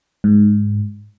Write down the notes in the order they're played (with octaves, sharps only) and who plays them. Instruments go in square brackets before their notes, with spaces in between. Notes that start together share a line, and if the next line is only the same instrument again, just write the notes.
[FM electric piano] G#2